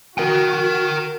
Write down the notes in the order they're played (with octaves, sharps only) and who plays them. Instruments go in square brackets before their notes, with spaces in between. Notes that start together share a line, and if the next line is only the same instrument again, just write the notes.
[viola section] F#4 [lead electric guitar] A#4 G5